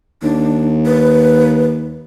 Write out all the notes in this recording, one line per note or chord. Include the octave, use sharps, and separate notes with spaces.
D#2 D4
B4